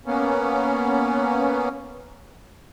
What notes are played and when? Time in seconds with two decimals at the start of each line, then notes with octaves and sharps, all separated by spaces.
0.06 A#3 B3 C#4